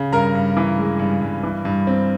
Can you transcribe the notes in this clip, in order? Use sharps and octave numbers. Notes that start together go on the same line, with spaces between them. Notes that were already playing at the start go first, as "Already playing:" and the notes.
Already playing: C#3
G2 A#4 A#5
G2
E3
G#3
G2
G2
E3
G2
C4